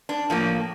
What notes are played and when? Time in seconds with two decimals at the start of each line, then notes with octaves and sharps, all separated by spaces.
0.09 D4
0.30 A2 F3 A#3